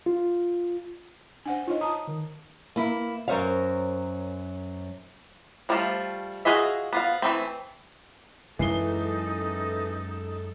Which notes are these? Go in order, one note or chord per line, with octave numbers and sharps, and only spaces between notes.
F4
D4 C5 F#5 G#5
D#4 F4 C#5 D#5
A5 A#5 D#6
D#3
A#3 E4
F#2 A#4 C5 C#5 F5
F3 G3 A3 F4
F4 F#4 G#4 D#5 E5
B3 F4 F5
E3 A3 C4
F#2 E3 F#3 G#3 D#4 A4 C7 G7